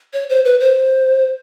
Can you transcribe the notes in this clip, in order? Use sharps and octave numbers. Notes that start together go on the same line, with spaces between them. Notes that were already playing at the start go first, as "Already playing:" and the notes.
C#5
C5
B4
C5